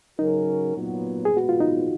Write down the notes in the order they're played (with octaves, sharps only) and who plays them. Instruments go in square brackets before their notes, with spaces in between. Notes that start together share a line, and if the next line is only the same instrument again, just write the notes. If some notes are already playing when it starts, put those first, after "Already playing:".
[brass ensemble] C#3 F#3 C#4 F#4 A#4 [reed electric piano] D#4
[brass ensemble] A#2 F#3 B3
[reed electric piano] G#4
[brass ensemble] A#2 G#3 B3 [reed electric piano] F#4
[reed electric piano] F4
D#4